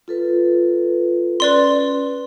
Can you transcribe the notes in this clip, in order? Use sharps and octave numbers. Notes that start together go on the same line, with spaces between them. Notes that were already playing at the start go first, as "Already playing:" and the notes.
F4 A4 B4
C#4 B4 D5 C6